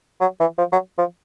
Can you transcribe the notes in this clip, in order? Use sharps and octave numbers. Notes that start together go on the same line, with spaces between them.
F#3
E3
F3
F#3
F3